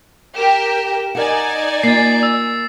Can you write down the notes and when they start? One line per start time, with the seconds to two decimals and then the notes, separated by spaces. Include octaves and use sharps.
0.36 G4 A#4 G5 E7
1.15 D#4 A#4 D5 F#5 G#5
1.83 A#3 F4 A6 C7
2.23 E6